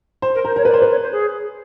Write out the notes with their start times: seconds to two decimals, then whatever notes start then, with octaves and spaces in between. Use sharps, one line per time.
0.22 C5
0.34 A#4
0.45 A#4 C5
0.56 A#4 C#5
0.65 B4
0.68 D5
0.74 C5
0.78 D5
0.82 B4
0.90 C#5
1.02 C5
1.12 G#4